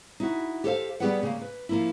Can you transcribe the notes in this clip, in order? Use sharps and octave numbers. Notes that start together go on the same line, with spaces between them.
D#4 E4 F#4
G4 A4 C5 F5
G3 B3 G4 G#4 B4 F#5
C#3 A#3
B4
F3 A#3 E4